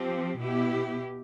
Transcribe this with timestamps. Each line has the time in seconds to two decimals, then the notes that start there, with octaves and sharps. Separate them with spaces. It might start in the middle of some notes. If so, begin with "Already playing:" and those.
Already playing: F3 C4 G4
0.38 B2 B3 E4 G4